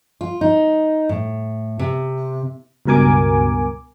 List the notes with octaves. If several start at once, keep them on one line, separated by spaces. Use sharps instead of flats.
F4
D#4
A2
C3
C#2 G2 B2 A#4 G#5 D6